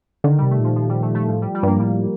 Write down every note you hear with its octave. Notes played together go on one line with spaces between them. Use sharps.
D3 D#3
C3 G3
A3
A#2 F3
F3
G3
A3
A3
A2 F3
G3
G3
G2 A#3
A2 G3